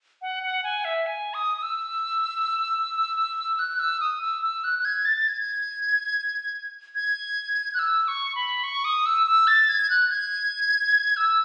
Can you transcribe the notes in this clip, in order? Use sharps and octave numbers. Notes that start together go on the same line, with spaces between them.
F#5
F#5
G#5
E5
G#5
D#6
D#6
E6
F#6
E6
D#6
E6
E6
F#6
F#6
G#6
A6
A6
G#6
G#6
F#6
E6
C#6
B5
C#6
D#6
E6
E6
A6
G#6
F#6
G#6
E6